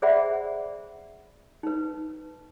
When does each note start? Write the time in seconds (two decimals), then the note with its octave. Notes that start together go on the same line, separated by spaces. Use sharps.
0.02 G#4 C5 D5 E5 F#5 B5
1.63 D#4 B4